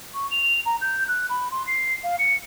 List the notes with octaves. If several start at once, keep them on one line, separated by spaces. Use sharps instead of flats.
C#6
F7
A#5
G6
F#6
B5
C6
C7
F5
C#7